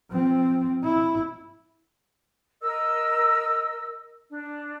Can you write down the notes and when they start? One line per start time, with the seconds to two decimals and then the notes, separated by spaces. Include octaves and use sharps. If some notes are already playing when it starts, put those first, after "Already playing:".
0.10 F3 C4
0.84 E4
2.62 A#4 D#5 E6
4.30 D4